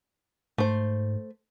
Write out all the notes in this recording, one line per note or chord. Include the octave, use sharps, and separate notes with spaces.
G#2 A3 C5